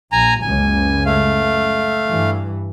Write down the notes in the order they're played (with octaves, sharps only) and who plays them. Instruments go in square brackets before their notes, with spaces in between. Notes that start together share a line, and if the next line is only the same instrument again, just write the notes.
[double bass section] A#1 [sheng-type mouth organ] G#5 A#5
[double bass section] F#1 C#2 [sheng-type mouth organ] G#5
[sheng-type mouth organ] A3 F5
[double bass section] G2 E3